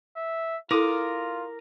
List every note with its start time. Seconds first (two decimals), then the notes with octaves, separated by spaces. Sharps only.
0.16 E5
0.71 E4 F4 A4 A#4 D6 D#6